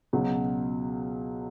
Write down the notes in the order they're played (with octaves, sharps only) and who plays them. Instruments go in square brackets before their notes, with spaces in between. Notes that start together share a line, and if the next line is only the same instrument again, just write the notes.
[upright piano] C#2 B2 F#3